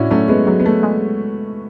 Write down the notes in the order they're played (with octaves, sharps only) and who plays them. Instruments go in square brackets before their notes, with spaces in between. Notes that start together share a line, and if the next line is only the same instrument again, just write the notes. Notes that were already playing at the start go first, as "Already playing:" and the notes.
Already playing: [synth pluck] A2 [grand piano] C#4 D4 E4 F#4
[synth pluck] F#3 [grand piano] A3 C#4
[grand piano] G#3 B3
[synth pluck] F#3 [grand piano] G#3
[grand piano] B3
A3
[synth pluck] G#3